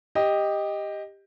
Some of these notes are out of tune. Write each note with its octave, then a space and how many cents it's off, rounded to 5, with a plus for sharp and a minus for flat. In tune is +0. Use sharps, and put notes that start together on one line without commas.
G4 +10 D#5 +0